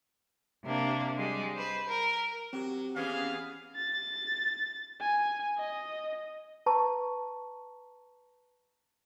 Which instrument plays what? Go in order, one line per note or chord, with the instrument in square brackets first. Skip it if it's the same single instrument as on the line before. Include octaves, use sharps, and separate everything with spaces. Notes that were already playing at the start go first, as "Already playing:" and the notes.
[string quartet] C3 A#3 D4
G3 G#3
B4 C5
A#4
[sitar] F#3 [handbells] C4 G4
[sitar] E3 C#4 [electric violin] B3 G#4 [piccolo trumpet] F5
[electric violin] A6
G#5
D#5
[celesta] B4 A5 A#5 C#6